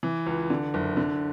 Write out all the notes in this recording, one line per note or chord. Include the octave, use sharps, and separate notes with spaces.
E3
C#2
D3
F#1
D3